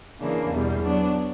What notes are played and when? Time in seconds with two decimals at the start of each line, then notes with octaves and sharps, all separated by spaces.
0.20 C#3 E3 A#3 D4
0.51 E2 B2 G3
0.82 F#3 B3 D4